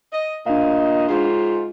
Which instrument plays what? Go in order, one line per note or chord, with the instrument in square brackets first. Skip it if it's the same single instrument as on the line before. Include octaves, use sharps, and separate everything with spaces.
[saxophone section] D#5
[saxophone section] A#2 D#5 [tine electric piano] D4 F5
[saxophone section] G#2 F4